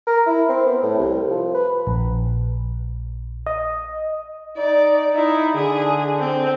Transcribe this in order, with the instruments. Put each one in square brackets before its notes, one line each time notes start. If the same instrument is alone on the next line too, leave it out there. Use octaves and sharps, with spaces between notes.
[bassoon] A#4
E4
C4
B3
A2
C2
F3
B4
[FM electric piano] A#1
D#5
[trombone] D#4 [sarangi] D5
[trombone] D#4 [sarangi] E4
[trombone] D3 [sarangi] G#4
[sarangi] C4